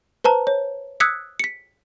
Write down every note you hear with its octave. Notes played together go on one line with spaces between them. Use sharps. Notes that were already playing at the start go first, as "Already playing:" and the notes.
B4 C5 A5 A#5
C#5
D#6 E6 F#6 G#6 B6 C#7
B6 C#7